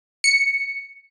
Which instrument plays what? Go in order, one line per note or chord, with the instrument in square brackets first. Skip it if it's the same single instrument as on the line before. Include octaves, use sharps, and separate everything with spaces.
[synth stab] C#7